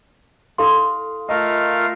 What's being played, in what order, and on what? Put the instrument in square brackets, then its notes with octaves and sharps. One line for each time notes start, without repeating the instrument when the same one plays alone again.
[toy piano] E4 A4 C6 [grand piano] F5 D#6
[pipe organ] A3 A#4 F5 [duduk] F4 [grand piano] D#5